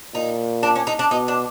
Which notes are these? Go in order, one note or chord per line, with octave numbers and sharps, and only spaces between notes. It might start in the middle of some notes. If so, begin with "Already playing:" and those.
A#2 D#4
D4
C#4
D#4
D4
B2 D#4
D4